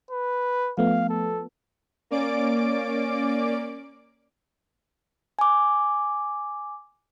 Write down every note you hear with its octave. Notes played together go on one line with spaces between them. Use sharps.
B4
F3 A3 B3 F5
A4
A#3 C#4 D5 D6 D7
G#5 D6